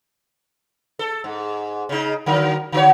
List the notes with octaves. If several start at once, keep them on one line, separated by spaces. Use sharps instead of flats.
A4
G#2
C#3 D#4
D3 F#3 A#4
D3 F#4 C#5